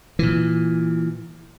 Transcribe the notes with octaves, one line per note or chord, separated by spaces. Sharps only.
A#2 E3